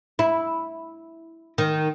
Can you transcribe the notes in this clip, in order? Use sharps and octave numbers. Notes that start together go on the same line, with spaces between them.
E4
D#3